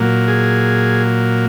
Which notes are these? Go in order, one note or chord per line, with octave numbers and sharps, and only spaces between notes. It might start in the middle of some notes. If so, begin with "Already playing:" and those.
Already playing: A#2 F#3 A#3
G#4